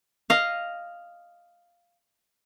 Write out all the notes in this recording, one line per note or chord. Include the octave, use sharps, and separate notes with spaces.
D#5 F5